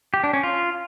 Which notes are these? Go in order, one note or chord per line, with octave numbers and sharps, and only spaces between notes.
G4
D4
C#4
F4